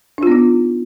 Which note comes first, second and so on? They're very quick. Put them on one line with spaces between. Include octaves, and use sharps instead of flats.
D4 F4 B3 D#4